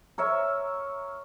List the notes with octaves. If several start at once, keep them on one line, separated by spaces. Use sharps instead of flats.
A#4 C#5 E5